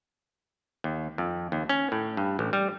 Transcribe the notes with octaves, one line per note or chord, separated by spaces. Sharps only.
D#2
F2
D#2
C#4
A2
G2
A1
G3